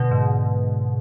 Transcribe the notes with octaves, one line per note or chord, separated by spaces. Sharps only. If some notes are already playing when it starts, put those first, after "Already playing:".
Already playing: B2 D3
G#2